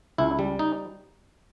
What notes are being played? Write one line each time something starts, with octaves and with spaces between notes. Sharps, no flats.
C#2 E4
G3
D#4